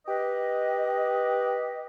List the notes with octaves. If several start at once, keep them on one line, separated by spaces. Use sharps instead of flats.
G4 B4 D#5